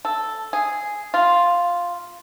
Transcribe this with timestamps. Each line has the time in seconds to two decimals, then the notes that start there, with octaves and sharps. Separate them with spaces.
0.05 A4
0.53 G#4
1.14 F4